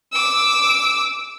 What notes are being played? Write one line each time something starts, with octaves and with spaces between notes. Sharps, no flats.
D6 E6